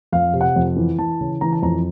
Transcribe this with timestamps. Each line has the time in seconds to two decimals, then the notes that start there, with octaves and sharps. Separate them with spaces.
0.12 F2 F5
0.34 C3
0.41 F#5
0.56 F2
0.76 E3
0.99 E3 A5
1.21 C#3
1.41 E3 A#5
1.52 A5
1.62 F2 A#5